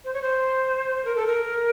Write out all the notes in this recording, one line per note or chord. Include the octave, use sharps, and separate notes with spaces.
C5
C#5
C5
A#4
A4
A#4